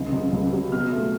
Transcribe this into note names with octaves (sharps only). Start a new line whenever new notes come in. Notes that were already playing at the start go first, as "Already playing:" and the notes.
Already playing: C#2
C#2
C#2
F#3
B2 F6
A3